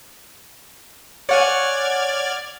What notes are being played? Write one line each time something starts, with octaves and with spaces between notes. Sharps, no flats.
C#5 D5 F#5 G#5 F6 G#6